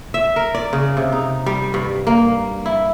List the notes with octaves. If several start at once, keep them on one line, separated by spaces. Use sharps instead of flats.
E5
A#4
D5
C#3
C3
D#4
G3
G2
A#3
E4